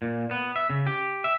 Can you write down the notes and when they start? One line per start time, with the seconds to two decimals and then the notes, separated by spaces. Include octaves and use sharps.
0.02 A#2
0.31 B3
0.56 E5
0.70 C#3
0.86 G4
1.24 E5